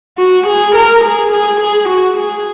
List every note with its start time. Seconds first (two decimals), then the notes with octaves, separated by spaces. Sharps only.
0.18 F#4
0.47 G#4
0.75 A#4
1.04 G#4
1.32 G#4
1.60 G#4
1.89 F#4
2.17 G#4